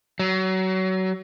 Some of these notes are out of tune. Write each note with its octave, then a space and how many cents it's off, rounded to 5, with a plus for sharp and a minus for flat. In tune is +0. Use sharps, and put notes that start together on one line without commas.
F#3 +25